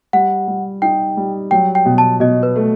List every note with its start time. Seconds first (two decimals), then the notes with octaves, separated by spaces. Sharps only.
0.13 G3 F#5
0.48 G3
0.82 D#4 G5
1.17 G3
1.51 F#3 G5
1.75 G5
1.85 B2
1.98 A5
2.20 B2 D#5
2.43 B4
2.56 A3